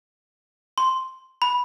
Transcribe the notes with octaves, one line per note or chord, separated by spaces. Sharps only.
C6
B5